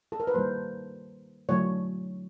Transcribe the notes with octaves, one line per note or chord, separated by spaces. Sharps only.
A4
A#4
B4
D#3 G3 A#3 C5
D3 F#3 A3 C#5